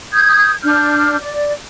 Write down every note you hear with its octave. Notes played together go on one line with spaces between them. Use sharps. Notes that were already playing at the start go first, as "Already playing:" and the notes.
D#6 G6 G#6
D4 F6 G6
D5